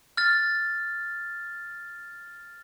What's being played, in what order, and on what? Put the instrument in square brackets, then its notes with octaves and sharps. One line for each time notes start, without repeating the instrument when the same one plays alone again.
[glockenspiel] F6 A6